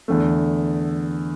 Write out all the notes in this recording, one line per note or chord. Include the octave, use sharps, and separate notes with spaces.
E2 D3 A3